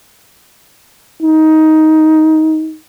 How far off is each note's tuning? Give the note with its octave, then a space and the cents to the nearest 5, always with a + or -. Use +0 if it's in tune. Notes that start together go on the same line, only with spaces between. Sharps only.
D#4 +15